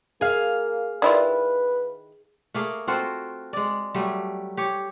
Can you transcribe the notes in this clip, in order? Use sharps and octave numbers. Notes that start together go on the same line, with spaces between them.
A#3 G#4 F5
D#3 E4 F4 B4 D5 C6
A3 A#3 G#4
C4 F4 F#4 A4
G#3 D5
F#3 G3 A3
G4 C#5